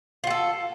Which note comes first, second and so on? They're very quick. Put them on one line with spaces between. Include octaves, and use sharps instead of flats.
F4 F#4 A4